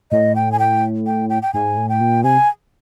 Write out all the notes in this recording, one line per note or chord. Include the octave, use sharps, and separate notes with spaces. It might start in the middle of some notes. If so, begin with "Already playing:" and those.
A2 D#5
G5
G#5
G5
G5
G5
G5
G#2 G#5
A2
G5
A#2
C3 G#5